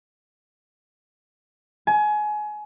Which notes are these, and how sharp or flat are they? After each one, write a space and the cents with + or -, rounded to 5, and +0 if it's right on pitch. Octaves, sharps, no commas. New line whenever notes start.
G#5 +25